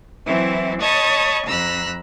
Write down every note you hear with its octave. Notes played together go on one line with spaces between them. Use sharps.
E3 F#3 C4 E4
C#5 D#5 A5 B5 C#6 D#6
F2 A#5 B5 E6 F#6